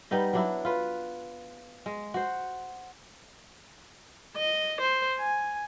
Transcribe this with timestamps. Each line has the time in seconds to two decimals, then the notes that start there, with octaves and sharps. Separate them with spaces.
0.11 G3 B3 D#4 D#5
0.33 F#3 D4 E4
0.65 F4 B4
1.86 G#3
2.14 F#4 C5
4.37 D#5
4.81 C5
5.19 G#5